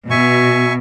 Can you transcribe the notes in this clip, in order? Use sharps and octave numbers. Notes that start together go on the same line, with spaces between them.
B2 E5 G#5 C#6